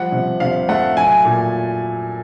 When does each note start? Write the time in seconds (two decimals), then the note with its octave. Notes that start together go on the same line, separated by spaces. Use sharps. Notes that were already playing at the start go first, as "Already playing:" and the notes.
Already playing: F3 G3 F#5
0.12 C3
0.40 C3 F5
0.69 A3 F#5
0.97 F#3 G#5
1.25 A#2